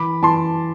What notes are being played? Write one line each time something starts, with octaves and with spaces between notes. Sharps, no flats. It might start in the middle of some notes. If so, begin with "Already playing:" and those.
Already playing: E3 B5 D6
E3 A5 C6